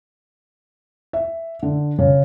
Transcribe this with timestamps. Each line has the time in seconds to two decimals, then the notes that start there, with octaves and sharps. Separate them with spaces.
1.13 E5
1.63 D3
1.99 C#3